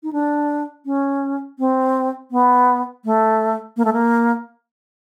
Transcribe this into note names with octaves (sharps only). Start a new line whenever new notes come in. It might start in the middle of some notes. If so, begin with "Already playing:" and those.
D#4
D4
C#4
C4
B3
A3
A#3
A3
A#3